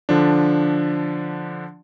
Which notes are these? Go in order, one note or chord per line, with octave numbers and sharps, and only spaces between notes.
D3 F3 D4